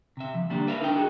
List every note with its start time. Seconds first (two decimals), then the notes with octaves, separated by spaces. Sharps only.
0.17 C3 E5
0.35 F3
0.50 D3 G3 A#3 D4
0.67 A#4 B4 E5 F5
0.81 D4 D#4 A#4 D#5 G5
0.95 F#4 G#4 A4